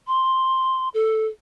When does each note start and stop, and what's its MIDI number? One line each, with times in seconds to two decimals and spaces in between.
0.07 0.88 84
0.94 1.27 69